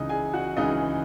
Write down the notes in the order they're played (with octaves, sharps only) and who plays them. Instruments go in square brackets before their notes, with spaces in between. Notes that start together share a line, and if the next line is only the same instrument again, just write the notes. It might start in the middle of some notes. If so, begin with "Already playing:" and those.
Already playing: [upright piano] C#2 C#3 E3 D#4 D#5
G#4 G#5
F#4 F#5
C#2 C#3 E3 D#4 D#5